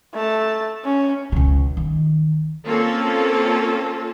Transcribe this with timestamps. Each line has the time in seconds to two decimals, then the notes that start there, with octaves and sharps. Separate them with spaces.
0.13 A3 A5
0.84 C#4
1.32 C#2 C#3
1.77 D#3
2.66 A#3 C4 C#4 F4 A4 A5